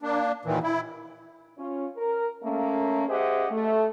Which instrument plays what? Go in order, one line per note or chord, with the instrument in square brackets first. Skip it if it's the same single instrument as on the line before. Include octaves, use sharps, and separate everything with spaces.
[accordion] A#3 D4
D#2 A#2 D#3 E3
E4
[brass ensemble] C#4 F4
A#4
A3 A#3 C#4
G4 G#4 C5 D#5 E5 F#5
A3